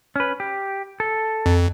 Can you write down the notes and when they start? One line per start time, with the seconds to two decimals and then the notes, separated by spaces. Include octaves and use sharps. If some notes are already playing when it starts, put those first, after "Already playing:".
0.16 C#4 B4
0.40 G4
1.00 A4
1.46 F2